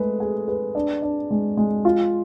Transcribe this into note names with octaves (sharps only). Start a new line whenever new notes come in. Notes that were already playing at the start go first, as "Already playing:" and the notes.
Already playing: G#3 A3 B4
G#4
B4
D4
D4
G#3
G#3
F4